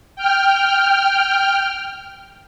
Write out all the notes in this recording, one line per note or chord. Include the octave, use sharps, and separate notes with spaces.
G5 F6